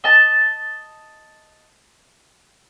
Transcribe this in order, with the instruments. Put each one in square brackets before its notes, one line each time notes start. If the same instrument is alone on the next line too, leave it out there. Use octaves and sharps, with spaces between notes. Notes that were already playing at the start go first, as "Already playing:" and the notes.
[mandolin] D#5 A5